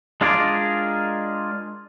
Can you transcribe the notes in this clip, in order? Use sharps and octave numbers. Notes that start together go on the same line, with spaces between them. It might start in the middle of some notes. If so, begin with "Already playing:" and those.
G#3 D4 F4 G#4 A#4 D5